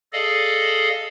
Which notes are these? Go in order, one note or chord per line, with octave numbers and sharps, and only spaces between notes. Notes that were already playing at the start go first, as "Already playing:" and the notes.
G#4 A4 D5 D#5 F5